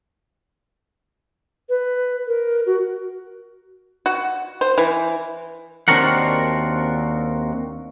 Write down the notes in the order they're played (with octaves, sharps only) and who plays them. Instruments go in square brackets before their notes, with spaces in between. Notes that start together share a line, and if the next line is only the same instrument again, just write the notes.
[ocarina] B4
A#4
F#4
[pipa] F#4
C5
E3
[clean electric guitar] D#2 C4 D4 F#4 A#4 F#5